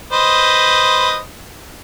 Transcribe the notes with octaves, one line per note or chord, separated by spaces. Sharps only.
B4 C5 D#5